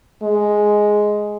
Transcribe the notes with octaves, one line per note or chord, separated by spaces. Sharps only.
G#3